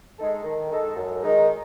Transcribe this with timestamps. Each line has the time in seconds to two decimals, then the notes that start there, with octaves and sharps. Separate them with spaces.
0.18 G#3 D#4 A4
0.44 D#3
0.71 G#3 D#4 A4
0.96 F#2
1.22 D#3 G#3 D#4